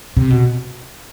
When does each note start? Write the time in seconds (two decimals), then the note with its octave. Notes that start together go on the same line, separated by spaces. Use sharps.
0.17 C3
0.30 B2